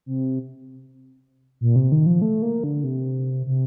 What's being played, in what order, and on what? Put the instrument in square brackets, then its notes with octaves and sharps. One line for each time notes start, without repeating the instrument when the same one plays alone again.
[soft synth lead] C3
A#2
C3
D#3
F3
A3
A#3
D3
C3
C3